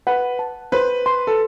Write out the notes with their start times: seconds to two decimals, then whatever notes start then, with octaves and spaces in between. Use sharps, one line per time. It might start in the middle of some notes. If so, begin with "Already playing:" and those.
0.07 B4 F#5
0.39 A5
0.72 B4 C5
1.06 C6
1.27 A4